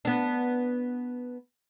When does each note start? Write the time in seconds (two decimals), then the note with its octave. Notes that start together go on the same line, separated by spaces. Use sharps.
0.05 B3 D4